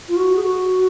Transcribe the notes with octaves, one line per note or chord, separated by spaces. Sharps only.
F4
F#4
G#4
F#4